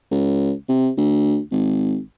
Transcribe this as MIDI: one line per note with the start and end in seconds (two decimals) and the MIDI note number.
0.11 0.53 37
0.69 0.90 48
0.97 1.39 38
1.51 1.98 32